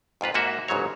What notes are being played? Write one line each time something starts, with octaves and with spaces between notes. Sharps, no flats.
F2 G#2 F4 B4
G#2 A#3 F#4 E5
G1 G#2 C#3 F#3 C#5